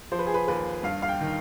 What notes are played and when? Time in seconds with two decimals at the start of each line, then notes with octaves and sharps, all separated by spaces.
0.12 F3 C5
0.19 B4
0.27 G#4
0.34 B4
0.48 D#2 B4
0.83 G2 F5
1.02 F5
1.09 G5
1.21 D#3